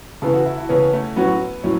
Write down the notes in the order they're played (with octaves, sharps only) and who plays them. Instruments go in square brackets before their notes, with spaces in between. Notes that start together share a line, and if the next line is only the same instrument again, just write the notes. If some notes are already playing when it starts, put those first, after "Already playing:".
[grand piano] C#3 E3 B3 [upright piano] A4
[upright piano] F#4
E4
E4
[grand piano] C#3 E3 B3 [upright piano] C#4
[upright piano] A3
[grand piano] A2 F#3 C#4 F#4 [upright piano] B3
[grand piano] A2 F#3 [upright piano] C#4